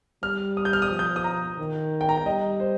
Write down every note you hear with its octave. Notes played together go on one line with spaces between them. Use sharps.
G3 F6
D#6
G6
F6
D#6
F3
G6
D#6
A#5
D#3
G5
A#5
G5
G3 D#5
C5